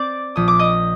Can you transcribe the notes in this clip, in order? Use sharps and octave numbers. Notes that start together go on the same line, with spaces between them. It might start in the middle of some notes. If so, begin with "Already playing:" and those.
Already playing: C4 D5 D6
A#1 D#6
D6
D#5 D#6